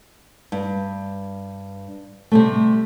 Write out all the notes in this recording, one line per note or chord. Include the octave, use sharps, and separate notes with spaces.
G2
C3 G3 A3